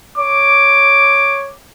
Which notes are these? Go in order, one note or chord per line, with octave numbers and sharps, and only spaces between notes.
C#5 D6